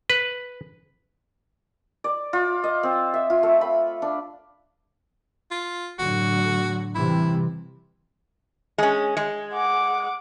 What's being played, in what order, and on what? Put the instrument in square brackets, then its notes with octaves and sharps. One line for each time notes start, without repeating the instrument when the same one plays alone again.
[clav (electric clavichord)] B4
[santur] D5
F4
D#5
C4
E5
F4
A3
B5
D4
[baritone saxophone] F4
[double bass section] A2 D3 F#3 [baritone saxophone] F#4
[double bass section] C3 E3 G3 [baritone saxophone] E4
[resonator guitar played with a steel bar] G#3 C#4
G#3
[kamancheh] F#5 D6